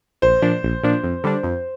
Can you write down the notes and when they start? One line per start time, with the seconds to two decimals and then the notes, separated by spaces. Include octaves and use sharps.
0.22 A#1 C5
0.42 A#2 F3 D4
0.63 A#1
0.83 A#2 F3 D4
1.03 F2
1.24 D3 G3 D4
1.43 F2